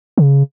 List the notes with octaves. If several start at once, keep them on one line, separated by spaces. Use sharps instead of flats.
C#3